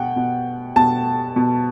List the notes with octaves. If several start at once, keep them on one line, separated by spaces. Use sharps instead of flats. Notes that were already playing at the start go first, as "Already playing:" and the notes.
Already playing: B2 F#5 G5
B2
B2 A5
B2